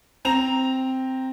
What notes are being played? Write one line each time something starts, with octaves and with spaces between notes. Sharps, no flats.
C4 A#5 F7